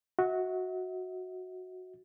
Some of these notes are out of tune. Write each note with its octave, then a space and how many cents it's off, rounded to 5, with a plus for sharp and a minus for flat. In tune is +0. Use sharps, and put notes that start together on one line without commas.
F#4 -5 E5 -45